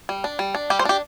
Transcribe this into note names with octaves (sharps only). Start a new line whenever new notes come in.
G3
D4
G3
D4
G3 G4
C5
D4 G4